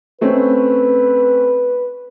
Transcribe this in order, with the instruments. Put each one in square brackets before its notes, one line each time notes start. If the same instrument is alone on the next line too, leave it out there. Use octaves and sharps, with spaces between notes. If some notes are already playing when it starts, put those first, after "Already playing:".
[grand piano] A3 C4 C#4 [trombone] B4